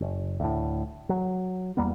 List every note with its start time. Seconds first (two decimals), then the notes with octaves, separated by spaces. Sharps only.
0.01 F#1
0.40 D2 A2
1.09 F#3
1.77 E2 G3 A#3 B3